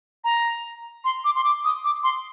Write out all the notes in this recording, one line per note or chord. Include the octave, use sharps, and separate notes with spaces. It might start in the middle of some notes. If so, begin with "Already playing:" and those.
A#5
C6
D6
C6
D6
D#6
D6
C6